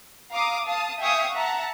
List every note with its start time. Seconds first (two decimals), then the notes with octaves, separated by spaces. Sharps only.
0.31 F5 A#5 D6 D#6
0.65 F5 A5 D#6
1.00 E5 F5 G5 G#5 C#6 D#6
1.32 E5 F#5 A5 A#5